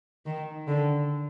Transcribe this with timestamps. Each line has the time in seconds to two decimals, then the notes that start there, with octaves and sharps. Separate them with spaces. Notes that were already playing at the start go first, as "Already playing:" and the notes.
0.26 D#3
0.67 D3